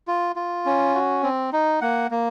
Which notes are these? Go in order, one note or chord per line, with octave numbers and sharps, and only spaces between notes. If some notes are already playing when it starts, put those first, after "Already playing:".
F4
F4
C#4
F#4
C4
D#4
A#3 F#5
A#3